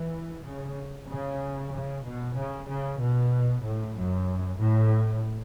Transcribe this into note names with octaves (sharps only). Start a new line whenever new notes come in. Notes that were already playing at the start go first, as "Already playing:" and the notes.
Already playing: E3
C#3
C#3
C#3
B2
C#3
C#3
B2
A2
F#2
A2